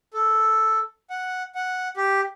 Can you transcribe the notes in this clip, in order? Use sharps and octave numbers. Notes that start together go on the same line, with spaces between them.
A4
F#5
F#5
G4